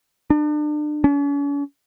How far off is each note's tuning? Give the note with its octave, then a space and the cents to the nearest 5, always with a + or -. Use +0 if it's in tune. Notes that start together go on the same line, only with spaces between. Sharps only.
D4 +35
C#4 +45